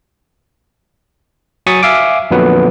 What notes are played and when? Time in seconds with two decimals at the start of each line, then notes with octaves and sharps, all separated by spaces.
1.67 F#3 G#5 C#6 D#6 A6 B6
1.83 E5 F5 G#5 D6
2.31 F2 A#2 D3 F#3 B3 B4